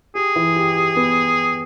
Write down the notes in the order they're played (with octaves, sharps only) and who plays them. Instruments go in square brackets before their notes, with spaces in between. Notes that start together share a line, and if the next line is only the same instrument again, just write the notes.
[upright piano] G4 [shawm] G#4
[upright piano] E3
G4
G4
B3